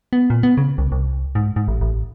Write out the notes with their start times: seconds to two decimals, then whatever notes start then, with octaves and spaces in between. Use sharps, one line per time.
0.13 B3
0.30 A#2
0.43 B3
0.57 C#3
0.78 C2
0.92 C2
1.35 G#2
1.56 G#2
1.68 A1
1.81 A1